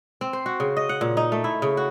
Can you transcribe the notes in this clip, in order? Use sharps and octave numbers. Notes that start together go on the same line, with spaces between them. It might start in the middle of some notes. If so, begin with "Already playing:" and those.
C4
C5
F#4
C#3
D#5
F#5
A#2
D#4
A3
E4
C#3
F#4